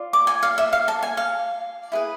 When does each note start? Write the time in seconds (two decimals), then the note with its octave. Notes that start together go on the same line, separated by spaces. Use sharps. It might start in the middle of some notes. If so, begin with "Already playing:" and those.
Already playing: F4 D5
0.13 D6
0.27 G#5
0.43 F5
0.58 E5
0.73 F5
0.88 A5
1.03 G#5
1.17 F5
1.92 E4 G#4 B4